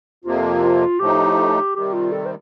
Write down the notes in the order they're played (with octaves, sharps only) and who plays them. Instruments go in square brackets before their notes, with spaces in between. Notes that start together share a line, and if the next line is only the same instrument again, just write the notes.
[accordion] F2 C3 F3 A#3 [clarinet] F4
[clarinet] F4
[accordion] A2 F3 A3 D#4 [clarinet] G4
[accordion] C3 D#3 G3 [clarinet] G4
[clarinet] F4
A4
C5